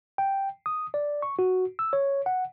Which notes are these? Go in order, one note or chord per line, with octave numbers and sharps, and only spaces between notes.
G5
D#6
D5
C#6
F#4
E6
C#5
F#5